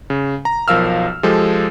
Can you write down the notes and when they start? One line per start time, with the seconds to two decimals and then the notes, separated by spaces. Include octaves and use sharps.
0.10 C#3
0.45 A#5
0.68 B1 F3 A#4 F5 E6 F6
1.23 F3 G#3 G4 A4